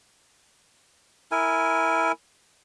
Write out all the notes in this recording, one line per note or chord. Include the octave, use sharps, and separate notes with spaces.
E4 A#4 G#5